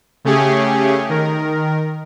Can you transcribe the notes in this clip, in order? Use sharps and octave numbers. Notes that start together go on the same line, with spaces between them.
C#3 A3 C#4 G4 G#4
D#3 A#4